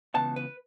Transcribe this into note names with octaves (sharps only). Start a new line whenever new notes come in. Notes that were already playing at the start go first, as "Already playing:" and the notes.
C#2 C#3 E3 B3 A5
B4